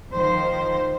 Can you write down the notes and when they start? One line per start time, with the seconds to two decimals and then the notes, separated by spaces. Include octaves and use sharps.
0.15 D#3 F3 C5